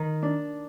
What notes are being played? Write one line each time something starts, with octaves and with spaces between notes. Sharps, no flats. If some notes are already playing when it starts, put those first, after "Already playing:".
Already playing: D#3
D4